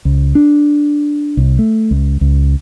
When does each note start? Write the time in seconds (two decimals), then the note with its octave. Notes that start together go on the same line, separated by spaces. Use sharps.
0.05 C#2
0.35 D4
1.37 C2
1.59 A3
1.91 C#2
2.21 C#2